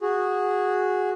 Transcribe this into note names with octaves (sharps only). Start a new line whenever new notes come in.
F#4 G#4